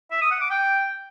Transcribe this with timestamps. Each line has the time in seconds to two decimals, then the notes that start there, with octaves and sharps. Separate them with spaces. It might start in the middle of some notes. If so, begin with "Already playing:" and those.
0.11 E5
0.21 D#6
0.31 F#5
0.41 D6
0.50 G5